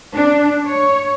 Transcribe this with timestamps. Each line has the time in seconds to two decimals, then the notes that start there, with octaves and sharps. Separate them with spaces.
0.15 D4
0.65 C#5